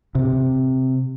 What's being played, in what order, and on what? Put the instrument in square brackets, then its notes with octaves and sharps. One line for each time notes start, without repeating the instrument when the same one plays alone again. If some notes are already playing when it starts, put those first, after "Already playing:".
[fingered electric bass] C3